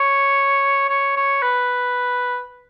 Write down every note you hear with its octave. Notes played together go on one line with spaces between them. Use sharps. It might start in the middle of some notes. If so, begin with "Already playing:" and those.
Already playing: C#5
C#5
C#5
B4